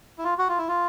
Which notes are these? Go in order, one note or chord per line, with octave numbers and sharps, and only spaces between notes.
E4
F4
F#4
F4
E4
F4